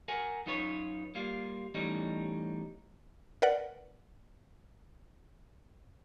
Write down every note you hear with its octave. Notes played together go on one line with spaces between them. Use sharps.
A#4 F#5 G#5
F#2 D#4 F4 B4 C#5
G3 A#3 F4
E2 A2 G3 C#4 D#4
A#4 B4 D5 F#5